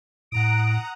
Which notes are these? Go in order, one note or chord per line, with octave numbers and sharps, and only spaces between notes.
A2 F#5 A#5 D#6 D7